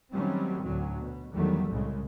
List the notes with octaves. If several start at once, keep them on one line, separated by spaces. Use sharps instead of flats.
D#3 F#3 G3 A3 C4 C#4
D2 A2 D3 F#3
B2
E2 D#3 F#3 G3 A3
C2 A2 C#3 G#3